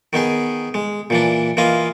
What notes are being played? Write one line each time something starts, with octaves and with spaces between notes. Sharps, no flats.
D#3 B3 D#4 G#4
G#3
A#2 E3 D4
E3 A#3 F4 D#5